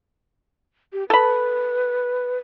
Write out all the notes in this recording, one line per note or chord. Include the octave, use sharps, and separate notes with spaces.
G4
A4 B4 B5